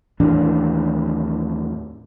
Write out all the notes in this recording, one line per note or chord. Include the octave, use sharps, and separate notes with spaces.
D#2 A2 E3 D4